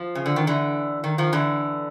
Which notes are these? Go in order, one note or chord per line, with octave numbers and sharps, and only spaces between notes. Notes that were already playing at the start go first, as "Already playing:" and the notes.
Already playing: F3
C#3
D3
D#3
D3 E3
D#3
D#3 F3
D3 E3